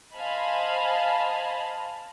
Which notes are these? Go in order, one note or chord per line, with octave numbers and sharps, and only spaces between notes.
C5 D#5 F5 G#5 A5 B5